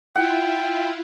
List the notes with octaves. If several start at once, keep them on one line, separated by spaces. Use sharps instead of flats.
E4 F4 F#5 G5